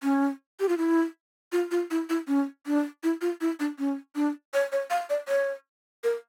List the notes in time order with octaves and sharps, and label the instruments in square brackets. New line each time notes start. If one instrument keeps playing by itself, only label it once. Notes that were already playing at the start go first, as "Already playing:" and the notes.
[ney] C#4
G4
F4
E4
F4
F4
E4
E4
C#4
D4
E4
F4
E4
D4
C#4
D4
C#5
C#5
F5
D5
C#5
A#4